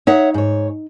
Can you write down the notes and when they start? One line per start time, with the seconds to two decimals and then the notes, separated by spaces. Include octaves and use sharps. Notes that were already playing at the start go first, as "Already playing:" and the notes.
0.07 D#4 C#5 E5 F#5
0.34 G#2 C#5